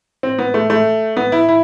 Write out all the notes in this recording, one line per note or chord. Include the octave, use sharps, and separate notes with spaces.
C4
B3
A3
A3
B3
E4
E4